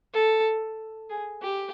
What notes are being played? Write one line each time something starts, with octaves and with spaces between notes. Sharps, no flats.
A4
G#4
G4